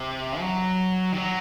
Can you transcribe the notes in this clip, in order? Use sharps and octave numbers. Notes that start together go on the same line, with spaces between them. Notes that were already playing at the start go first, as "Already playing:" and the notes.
Already playing: C3
F#3
D#3
F#3